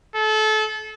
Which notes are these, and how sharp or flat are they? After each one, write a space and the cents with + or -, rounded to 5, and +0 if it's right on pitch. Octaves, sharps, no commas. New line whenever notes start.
A4 -30